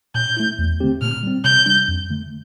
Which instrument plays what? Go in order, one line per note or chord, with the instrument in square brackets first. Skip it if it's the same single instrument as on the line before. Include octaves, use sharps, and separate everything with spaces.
[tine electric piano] A#2 [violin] G6
[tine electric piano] A3 E4
E2
D3 A3 C4 G4
[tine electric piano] A#2 [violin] F6
[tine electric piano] G3 C4
[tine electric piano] C3 [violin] G6
[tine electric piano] G3 D4
F2
D3 A3